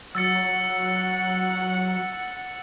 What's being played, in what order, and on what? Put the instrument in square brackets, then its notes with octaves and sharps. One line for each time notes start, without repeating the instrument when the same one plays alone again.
[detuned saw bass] F#3 [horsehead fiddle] F#5 [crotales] E6 A6 C#7